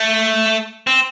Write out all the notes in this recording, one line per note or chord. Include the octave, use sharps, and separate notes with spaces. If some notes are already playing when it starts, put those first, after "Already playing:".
Already playing: A3
C4